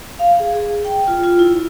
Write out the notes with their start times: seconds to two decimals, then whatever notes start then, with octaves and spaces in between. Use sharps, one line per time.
0.19 F5
0.40 G#4
0.55 G#4
0.85 G5
1.07 F4
1.24 F4
1.39 E4